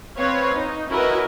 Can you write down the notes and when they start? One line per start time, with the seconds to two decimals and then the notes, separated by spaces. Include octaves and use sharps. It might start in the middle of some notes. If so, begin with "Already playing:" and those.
0.17 C4 B4 C#5 F5
0.54 D#4
0.90 C#4 E4 F#4 A#4 B4 D#5